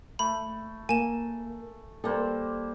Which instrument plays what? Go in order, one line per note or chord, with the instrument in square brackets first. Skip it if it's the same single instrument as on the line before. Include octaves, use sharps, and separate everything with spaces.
[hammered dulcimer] A3 [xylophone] B5
[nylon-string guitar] A#3 [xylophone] G#5 E7
[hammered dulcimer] G3 A#3 C5 [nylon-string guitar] A4